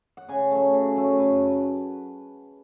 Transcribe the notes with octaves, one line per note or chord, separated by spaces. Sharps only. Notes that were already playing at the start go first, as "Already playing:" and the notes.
F#5
C#3 G#5
F#3 A3
C#3
F#3 A3
F#2 B4